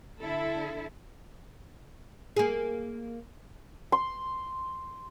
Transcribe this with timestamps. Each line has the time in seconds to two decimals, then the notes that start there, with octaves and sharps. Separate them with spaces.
0.20 D3 E4 A4
2.36 A#3 G#4
3.92 C6